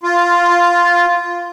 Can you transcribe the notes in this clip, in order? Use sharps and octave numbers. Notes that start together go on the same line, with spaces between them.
F4